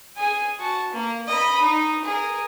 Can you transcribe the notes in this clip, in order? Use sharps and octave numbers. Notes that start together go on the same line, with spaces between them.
G#4 G#5
F#4 A5
A#3
D#5 B5
D#4
G#4 A#4